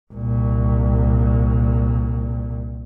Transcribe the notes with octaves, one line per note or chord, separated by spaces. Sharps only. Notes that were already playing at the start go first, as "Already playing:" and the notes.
C2 A#2